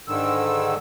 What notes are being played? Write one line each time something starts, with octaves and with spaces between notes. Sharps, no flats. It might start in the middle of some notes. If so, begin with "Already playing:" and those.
G#2 D3 D#3 E6